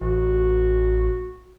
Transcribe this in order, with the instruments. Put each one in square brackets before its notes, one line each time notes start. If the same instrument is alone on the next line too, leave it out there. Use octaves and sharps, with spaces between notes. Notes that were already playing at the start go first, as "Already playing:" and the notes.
[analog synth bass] A1 [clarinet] F#4